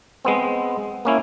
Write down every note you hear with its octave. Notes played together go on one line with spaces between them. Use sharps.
G#3 B3 C4
A#3 C#4 E4